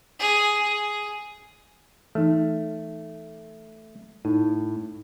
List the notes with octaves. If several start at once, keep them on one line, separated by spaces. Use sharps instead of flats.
G#4
G#4
E3 A3 D#4
A2 D#4